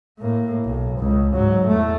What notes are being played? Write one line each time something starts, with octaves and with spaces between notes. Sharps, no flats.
A2 A#3
B1
C#2
G#2 F#3
E2 A3